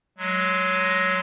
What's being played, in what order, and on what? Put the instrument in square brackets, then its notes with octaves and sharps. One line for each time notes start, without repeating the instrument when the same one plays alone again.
[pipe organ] F#3 G#3